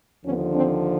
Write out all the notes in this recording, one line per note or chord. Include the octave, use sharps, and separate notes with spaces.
D#2 D3 F3 B3 C#4
C4 D4